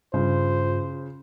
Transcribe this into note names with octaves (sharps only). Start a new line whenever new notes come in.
G2 C#3 F4 C5